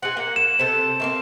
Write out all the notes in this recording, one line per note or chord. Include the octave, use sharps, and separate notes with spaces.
C4 G#4 F#5
A#3 F#5
E7
C3 A4 C5
A3 A#3 C4